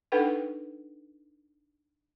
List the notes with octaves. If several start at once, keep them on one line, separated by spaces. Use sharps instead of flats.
D4 D#4 A4 B4 F#5 G5